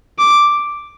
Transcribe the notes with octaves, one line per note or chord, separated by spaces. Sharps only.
D6